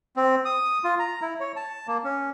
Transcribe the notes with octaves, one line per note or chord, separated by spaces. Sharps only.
C4
D#6
F4
A#5
E4
C#5
A5
A#3
C#4